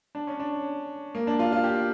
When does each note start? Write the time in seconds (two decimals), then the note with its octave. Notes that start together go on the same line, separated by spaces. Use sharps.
0.15 D4
0.27 C#4
0.40 D4
1.15 A#3
1.27 D4
1.39 F4
1.52 F4
1.64 G4